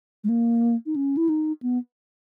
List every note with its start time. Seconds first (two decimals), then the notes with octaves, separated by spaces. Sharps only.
0.24 G#3
0.29 A#3
0.86 D#4
0.96 C#4
1.17 E4
1.29 D#4
1.63 B3